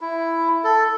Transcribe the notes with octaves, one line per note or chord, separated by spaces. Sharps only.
E4
A4